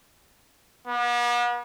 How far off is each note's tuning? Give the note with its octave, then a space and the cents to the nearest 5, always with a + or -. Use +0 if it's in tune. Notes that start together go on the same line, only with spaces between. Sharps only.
B3 -45